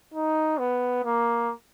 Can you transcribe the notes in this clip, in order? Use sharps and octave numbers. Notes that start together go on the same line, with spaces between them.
D#4
B3
A#3